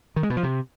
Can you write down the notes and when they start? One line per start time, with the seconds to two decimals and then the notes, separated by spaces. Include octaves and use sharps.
0.16 D#3
0.23 G#3
0.30 B2
0.37 F3
0.43 C3